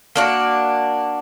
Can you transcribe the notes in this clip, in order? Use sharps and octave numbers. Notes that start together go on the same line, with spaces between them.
A#3 D4 F#4